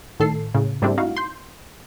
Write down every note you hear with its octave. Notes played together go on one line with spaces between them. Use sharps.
A2 D#3 A4 C7
A2 C#3
G#2 G3 A3 C4 D4 E4
D#4 E4 F#4 F5
C6 G6